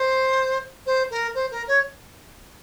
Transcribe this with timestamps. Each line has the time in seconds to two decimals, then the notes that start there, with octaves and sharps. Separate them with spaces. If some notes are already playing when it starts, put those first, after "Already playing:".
Already playing: C5
0.86 C5
1.10 A#4
1.35 C5
1.51 A#4
1.68 C#5